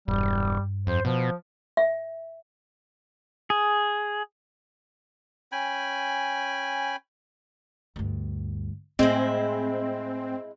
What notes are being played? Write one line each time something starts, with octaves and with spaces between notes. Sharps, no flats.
E1 G2 G3
F2 C5
B2 F3
E5
G#4
C#4 G5 G#5 B5
D2 G2
A2 G#3 C4 E4